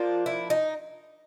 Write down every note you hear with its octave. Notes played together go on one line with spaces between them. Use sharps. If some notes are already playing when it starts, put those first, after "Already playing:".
Already playing: F3 A#3 D4 F4
E4
D#4